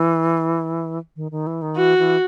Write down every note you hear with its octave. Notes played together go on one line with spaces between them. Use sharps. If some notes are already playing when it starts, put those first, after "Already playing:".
Already playing: E3
D#3
D#3
E3
D#3
E3 F#4
E3